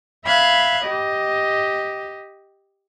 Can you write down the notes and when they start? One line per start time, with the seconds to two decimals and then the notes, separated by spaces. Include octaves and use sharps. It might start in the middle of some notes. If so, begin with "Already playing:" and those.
0.26 E5 F5 B5 F#6 G#6
0.84 G4 D#5